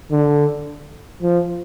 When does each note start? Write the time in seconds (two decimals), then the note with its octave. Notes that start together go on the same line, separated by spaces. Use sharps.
0.12 D3
1.23 F3